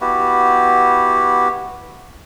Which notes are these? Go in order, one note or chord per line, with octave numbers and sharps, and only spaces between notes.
B3 E4 F#4 G4